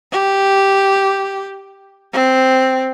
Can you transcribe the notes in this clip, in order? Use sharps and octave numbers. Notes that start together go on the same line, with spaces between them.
G4
C4